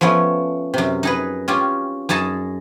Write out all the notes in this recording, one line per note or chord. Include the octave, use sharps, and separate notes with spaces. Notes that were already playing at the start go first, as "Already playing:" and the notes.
F3 A3 B3 C#4
F#2 C3
D#4 G#4 B4
C#4 F4 G4
F#2 D#4 G#4 A5